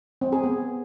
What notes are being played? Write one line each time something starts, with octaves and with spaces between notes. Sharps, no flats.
C4
G#4
B3